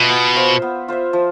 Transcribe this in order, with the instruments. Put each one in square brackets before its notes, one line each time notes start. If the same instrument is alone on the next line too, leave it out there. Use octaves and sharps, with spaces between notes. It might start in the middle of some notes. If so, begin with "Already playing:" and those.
Already playing: [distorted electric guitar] B2 [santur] F4 E5
[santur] B3
F4 C5 E5
B3
F4 C5 E5
F3